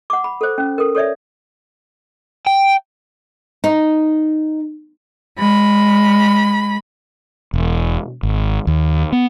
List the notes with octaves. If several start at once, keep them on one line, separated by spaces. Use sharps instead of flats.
F#5 D6
B5
A4 C5
C#4
A4 A#4
A4 C#5 D5 E5
G5
D#4
G#3 B5
E1
G#1
D#2
B3